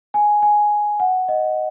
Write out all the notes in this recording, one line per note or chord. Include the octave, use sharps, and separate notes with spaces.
G#5
G#5
F#5
D#5